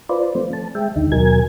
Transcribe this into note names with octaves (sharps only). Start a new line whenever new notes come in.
F4 B4 C5 D5
F3 A3 C4 C5
A5
G#3 E5 G5
D#2 D3 D#4
D#2 B2 F#3 A#4 G#5 G#6